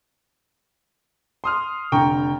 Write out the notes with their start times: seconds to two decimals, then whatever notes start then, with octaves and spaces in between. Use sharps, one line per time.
1.44 C6 D#6 F6
1.92 F1 D3 G5 A#5 C#6